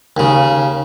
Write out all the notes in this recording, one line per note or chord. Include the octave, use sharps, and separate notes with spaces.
D#2 C#3